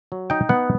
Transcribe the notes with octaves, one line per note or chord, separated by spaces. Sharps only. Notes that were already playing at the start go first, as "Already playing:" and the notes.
F#3
D#4 G5
B3 F#5